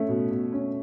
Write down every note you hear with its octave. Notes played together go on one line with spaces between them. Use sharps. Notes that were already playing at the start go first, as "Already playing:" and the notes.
Already playing: A3 C#4
B2
B2
C#4